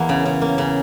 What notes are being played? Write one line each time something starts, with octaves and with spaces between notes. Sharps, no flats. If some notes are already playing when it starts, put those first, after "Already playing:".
Already playing: E2 A#3
C#3
C#3
A#3
C#3